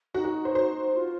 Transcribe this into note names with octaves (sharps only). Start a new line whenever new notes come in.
D#4 F#4
F#4
C5
C5
F4